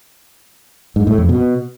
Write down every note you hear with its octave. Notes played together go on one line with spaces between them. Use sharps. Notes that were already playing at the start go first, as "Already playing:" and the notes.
G#2
A2
F2
B2